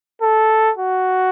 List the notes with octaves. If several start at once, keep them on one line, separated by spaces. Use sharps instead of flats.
A4
F#4